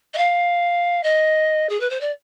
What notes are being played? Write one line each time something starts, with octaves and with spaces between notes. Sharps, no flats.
D#5
F5
D#5
G#4
B4
C5
D5